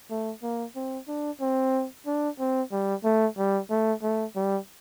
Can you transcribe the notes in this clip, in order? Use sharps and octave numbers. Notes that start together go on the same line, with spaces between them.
A3
A#3
C4
D4
C4
D4
C4
G3
A3
G3
A3
A3
G3